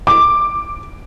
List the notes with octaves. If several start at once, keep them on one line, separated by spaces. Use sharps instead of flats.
D6